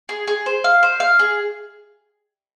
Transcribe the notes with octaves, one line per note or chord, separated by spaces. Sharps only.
G#4
G#4
C5
F5
C5
F5
G#4